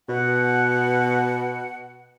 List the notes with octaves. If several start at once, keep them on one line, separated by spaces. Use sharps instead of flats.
B2 F#5